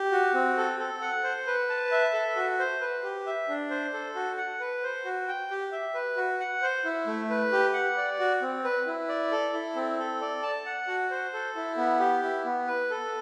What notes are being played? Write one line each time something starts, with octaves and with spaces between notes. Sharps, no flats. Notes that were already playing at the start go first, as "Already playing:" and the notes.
Already playing: G4
F#4
C4
A4
A4
F#5
C5
B4
A5
E5
A4
F#4
C5
B4
G4
E5
D4
C5
A4
F#4
F#5
B4
C5
F#4
G5
G4
E5
B4
F#4
F#5
C5
E4
A3
B4
G4
F#5
D5
F#4
C4
B4
E4
D5
A4
E4
C4
A4
D5
A5
F#5
F#4
C5
A4
E4
B3
G4
E4
B3
B4
A4